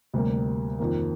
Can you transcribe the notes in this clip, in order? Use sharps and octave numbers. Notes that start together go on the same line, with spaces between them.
D2 C3 G3 A#3
F2 D#3 A#3